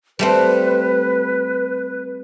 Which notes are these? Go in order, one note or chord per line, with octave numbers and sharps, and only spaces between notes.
G3 A3 C4 B4